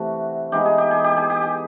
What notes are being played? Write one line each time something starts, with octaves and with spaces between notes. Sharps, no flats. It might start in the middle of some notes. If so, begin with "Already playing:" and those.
Already playing: C3 E3 A3 F#4
E3 G#3 B3 D#4 G4
G#4
G4
G#4
G4
G#4
G4
G#4